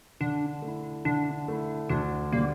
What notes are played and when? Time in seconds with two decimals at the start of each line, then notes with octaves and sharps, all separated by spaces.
0.21 D3 D4
0.62 A3
0.67 E4
1.05 D3 D4
1.48 A3 E4
1.89 D2 D4
2.32 D3 G3 A#3 D4 G4